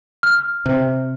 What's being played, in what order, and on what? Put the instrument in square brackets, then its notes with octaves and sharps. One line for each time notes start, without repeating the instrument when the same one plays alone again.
[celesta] F6
[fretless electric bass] C3